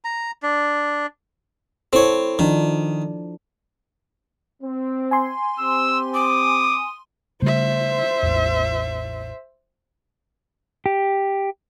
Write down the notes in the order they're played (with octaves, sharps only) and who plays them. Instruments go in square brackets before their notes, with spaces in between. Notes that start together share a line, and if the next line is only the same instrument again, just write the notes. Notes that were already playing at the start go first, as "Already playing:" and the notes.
[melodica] A#5
D4
[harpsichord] C4 C#5 [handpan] E4 A4
[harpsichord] D#3 [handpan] F3 D4
[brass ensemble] C4
[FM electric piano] G#5 C6
[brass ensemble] C4 G4 [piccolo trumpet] E6
[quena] D6 [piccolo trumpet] D#6
[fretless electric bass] C#3 G3 A3 [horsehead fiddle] C5 E5
[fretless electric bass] A1 E2
[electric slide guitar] G4